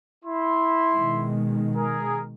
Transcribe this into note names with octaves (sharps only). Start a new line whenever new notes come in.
E4 C6
B2 D#3 G#3
G#4 A#4